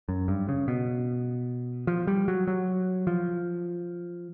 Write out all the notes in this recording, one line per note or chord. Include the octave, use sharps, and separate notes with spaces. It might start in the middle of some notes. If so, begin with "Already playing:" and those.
F#2
G2
C#3
B2
F3
G3
F#3
F#3
F3